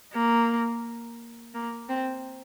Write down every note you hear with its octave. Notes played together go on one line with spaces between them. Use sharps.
A#3
A#3
C4